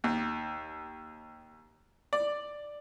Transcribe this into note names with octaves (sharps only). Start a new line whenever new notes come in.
D#2
D5